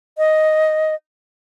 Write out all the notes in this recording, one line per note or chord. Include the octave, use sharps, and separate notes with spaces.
D#5